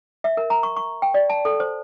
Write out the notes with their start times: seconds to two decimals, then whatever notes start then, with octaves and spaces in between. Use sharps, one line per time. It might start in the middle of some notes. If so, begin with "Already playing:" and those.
0.24 E5
0.37 A#4
0.50 A#5
0.63 C#6
0.76 C#6
1.02 G5
1.14 D5
1.30 A5
1.45 A4
1.60 C5